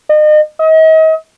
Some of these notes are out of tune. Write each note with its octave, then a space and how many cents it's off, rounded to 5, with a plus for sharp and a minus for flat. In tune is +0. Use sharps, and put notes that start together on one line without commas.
D#5 -35
D#5 +40